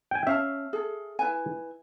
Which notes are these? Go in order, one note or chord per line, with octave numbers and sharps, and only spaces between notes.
G5 G#5
C#4 E5 F5 A5
G#4 A4
E4 B4 G#5